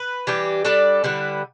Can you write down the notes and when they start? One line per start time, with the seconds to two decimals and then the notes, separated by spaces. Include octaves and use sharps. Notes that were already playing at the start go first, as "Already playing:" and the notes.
Already playing: B4
0.27 E3 G3 D4 G4
0.65 G3 D4 A4 D5
1.04 D3 G3 E4 B4